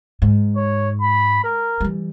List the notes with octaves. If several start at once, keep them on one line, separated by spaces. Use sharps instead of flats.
G#2
C#5
B5
A#4
E3 G3